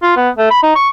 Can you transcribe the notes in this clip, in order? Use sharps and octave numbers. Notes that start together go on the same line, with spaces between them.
F4
B3
A3
B5
D#4
C#6